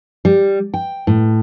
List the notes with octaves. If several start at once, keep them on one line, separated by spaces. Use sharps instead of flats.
G3
G5
A2